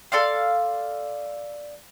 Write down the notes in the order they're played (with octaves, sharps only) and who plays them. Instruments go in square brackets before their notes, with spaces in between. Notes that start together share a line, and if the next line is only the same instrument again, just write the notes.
[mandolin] A4 D5 F5 C6